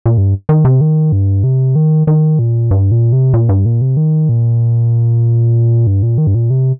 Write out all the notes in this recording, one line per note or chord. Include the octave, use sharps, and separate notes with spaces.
A#2
G2
D#3
C3
D#3
G2
C3
D#3
D#3
A#2
G2
A#2
C3
A#2
G2
A#2
C3
D#3
A#2
G2
A#2
D#3
G2
A#2
C3